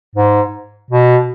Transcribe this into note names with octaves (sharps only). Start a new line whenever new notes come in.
G#2
B2